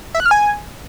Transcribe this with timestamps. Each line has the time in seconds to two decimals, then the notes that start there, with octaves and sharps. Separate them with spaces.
0.15 E5
0.20 F#6
0.26 F6
0.31 G#5